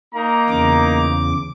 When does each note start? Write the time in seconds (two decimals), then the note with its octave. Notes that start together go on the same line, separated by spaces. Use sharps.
0.15 A#3 D#4 A#5
0.50 E2 C#3 D6